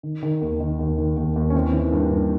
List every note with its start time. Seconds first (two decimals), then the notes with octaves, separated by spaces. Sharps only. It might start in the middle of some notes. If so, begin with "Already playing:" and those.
0.03 D#3
0.23 D#3
0.41 D#2
0.60 D#3
0.79 D#2
0.98 D#3
1.17 D#2
1.36 D#2
1.50 C#4
1.55 E3 C4
1.73 E3
1.92 G2
2.11 G2